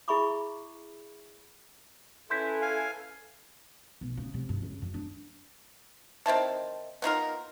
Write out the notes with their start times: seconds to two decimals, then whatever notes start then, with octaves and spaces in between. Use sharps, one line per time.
0.08 E4 G#4 E5 B5 C#6 D6
2.30 C#4 E4 A4 B4 C6 G6 B6
2.62 F5 G#5
4.01 B1
4.17 C#3
4.34 C3
4.49 G2
4.62 C#2
4.82 F#2
4.94 D4
6.26 D#3 C4 E4 A5
7.02 B3 D#4 F4 A#4